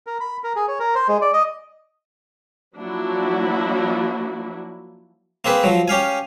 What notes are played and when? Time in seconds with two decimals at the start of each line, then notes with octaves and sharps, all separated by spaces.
0.07 A#4
0.20 B5
0.44 A#4
0.56 G#4
0.68 C#5
0.79 A#4
0.95 C5
1.08 G#3
1.21 D5
1.33 D#5
2.77 F3 F#3 A#3 D4 E4 F#4
5.45 A#3 C4 G#4 B4
5.63 F3 F#3
5.88 C#4 G4 F5 G#5